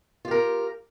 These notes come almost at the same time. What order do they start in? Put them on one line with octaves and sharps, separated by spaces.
F4 G4 A#4